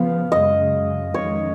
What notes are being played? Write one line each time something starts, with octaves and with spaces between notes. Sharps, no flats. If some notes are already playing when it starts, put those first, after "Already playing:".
Already playing: C#3 F3 B3 F5
F#2 C#3 G#3 D#5
F2 D#3 G#3 C#4 C#5